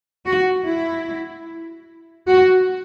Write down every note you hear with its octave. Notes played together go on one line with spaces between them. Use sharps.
F#4
E4
F#4